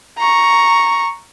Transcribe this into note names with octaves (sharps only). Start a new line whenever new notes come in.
A#5 C#6